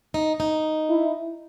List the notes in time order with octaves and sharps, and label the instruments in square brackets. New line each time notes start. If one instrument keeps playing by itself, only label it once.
[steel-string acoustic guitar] D#4
D#4
[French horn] E4